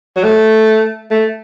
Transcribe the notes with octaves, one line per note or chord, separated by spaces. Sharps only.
F#3
A3
A3